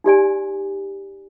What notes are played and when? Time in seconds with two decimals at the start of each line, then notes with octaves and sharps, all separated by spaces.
0.04 D#4 G4 D5 G#5